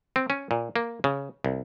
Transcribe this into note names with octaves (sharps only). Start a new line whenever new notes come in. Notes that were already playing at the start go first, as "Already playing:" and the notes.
C4
C#4
A#2
A#3
C#3
C2